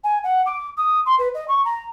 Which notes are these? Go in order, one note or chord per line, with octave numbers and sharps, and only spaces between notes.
G#5
F#5
D6
D#6
C6
B4
D#5
C#6
A#5